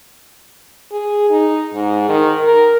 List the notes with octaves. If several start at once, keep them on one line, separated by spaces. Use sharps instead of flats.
G#4
D#4
G#2
D#3
A#4